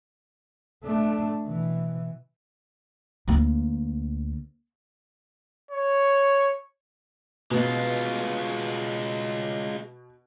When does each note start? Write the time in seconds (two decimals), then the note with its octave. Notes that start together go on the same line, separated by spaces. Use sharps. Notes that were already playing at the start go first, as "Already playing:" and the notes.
0.83 A3 D4
1.46 B2 E3
3.28 D2 A#3
5.71 C#5
7.51 B2 G#3 F4